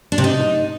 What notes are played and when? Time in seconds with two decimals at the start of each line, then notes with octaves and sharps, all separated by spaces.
0.12 D4
0.18 C3
0.24 D#4